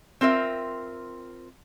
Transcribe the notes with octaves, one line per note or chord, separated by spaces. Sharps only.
C4 F4 A#4 E5